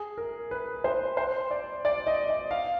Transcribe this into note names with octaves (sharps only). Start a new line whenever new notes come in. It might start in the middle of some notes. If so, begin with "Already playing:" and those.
Already playing: G#4
A#4
B4
C5
C5
D5
D5
D#5
D#5
F5